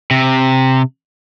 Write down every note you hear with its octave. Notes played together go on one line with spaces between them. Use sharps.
C3